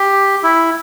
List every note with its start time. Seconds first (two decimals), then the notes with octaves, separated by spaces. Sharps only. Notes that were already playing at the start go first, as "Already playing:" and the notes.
Already playing: G4
0.43 E4